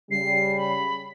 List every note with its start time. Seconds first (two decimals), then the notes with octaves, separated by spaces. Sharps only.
0.11 C#3 G3 C7
0.57 B5